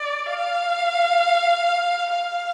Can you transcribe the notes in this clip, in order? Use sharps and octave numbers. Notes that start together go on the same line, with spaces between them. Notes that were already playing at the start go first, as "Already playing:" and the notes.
Already playing: D5
F5
F5